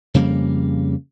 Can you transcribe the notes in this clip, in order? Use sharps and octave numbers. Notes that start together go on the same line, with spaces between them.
F2 C#3 G3 A#3